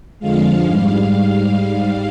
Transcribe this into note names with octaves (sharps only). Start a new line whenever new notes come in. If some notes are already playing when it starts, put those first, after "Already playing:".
F2 D3 F3 G#3 F5
G#2 G3